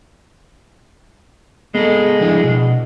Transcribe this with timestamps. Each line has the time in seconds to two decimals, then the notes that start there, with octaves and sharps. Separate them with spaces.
1.75 G#3 B3 A4
2.21 F3 D4 E4
2.44 B2